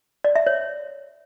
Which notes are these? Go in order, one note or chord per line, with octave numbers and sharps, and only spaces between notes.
D5
E5
C#5